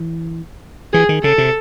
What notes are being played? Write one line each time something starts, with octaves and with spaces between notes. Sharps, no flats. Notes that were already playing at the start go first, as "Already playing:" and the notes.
Already playing: E3
E3 G#4
D#3
C#3 A4
C3